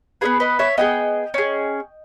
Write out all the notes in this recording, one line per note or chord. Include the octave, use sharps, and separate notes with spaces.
B3 D#4 G#4 B4
B4 D#5
C#5 E5
B3 E4 G#4 D#5 G5
C#4 G#4